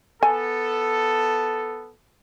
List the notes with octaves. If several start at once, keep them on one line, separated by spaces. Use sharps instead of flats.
B3 A4 G#5